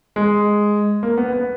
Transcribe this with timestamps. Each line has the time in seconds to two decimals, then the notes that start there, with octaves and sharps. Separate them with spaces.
0.16 G#3
1.03 A#3
1.17 B3
1.32 B3